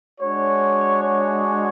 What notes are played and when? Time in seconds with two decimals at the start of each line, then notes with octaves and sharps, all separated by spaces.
0.20 G#3 D4 F#4 C#5
1.03 C#5